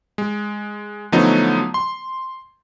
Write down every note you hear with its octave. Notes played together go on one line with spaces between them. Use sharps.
G#3
D3 F3 F#3 A3 B3 D#4
C6